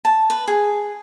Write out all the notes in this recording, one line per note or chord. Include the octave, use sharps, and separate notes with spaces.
A5
B4
G#4